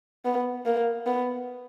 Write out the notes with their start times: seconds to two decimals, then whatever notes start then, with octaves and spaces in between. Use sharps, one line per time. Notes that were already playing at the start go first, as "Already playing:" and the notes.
0.25 B3
0.66 A#3
1.06 B3